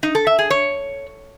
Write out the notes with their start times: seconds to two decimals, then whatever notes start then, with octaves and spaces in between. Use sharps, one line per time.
0.03 D#4
0.15 A4
0.27 E5
0.39 G#4
0.50 C#5